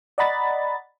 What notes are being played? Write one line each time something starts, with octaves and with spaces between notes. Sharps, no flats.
D5 D#5 F#5 A#5 B5 A6